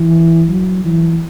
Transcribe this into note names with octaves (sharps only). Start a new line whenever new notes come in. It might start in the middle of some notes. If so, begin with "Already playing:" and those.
Already playing: E3
F#3
E3